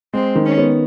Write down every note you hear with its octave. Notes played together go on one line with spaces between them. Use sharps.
G#3 C4
D#3
C#4
B3